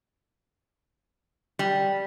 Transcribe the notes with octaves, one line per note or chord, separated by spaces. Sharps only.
G3